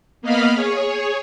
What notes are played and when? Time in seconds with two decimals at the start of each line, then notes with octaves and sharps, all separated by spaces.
0.22 A#3 B3 D#5 F5 B5 F6
0.55 G#4 C#5